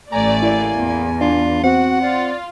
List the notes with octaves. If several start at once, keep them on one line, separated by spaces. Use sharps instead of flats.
A1 A3 D5 G#5 A#5
A#3 E4
E2
D4 F4
C4 F#4 F#5
F4 D5